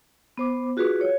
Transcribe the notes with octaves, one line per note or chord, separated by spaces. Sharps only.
B3 C5 D6
F4 F#4 G#4 B4
C#5